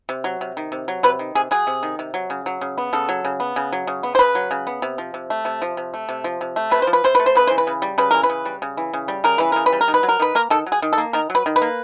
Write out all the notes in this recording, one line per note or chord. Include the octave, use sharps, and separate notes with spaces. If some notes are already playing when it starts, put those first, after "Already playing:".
C3
F#3
C3
D#3
C3
F#3
C3 B4
D#3
C3 G#4
F#3 G#4
C3
D#3
C3
F#3
C#3
F#3
C#3
B3
C#3 A4
F#3
C#3
B3
C#3
F#3
C#3
B3
C5
C#3 B4
F#3
C#3
B3
C3
F3
C3
A3
C3
F3
C3
A3
C3
F3
C3
A3
C3 B4
C5
F3
B4
C3 C5
A3 B4
C5
C#3 B4
E3 C5
B4
C#3
G3
C#3 B4
E3 A#4
B4
C#3
G3
C#3
E3
C#3
G3
C#3 A#4
E3 B4
C#3 A#4
B4
G3
A#4
D#3
B4
F#3
A#4
D#3 B4
A#3 A#4
D#3 A4
F#3
G#4
D#3
A4
A#3
D#3 A#4
F#3
B4
D#3
B4
A#3